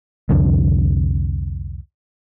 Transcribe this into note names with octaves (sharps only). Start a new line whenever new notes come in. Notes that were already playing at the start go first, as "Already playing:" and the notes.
C2 F2 D3